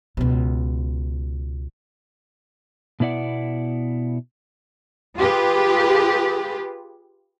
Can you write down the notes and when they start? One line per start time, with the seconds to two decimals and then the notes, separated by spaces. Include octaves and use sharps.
0.17 C#2 B2
3.00 B2 B3 E4 D5 F#5
5.17 F4 G4 G#4 B4